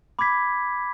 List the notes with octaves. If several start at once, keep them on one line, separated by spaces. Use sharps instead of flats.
B5 D6 G#6 B6